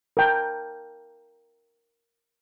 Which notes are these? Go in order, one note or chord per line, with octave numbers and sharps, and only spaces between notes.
A#4 G5 A5